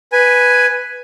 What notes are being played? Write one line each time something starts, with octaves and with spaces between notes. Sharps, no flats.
B4 G#5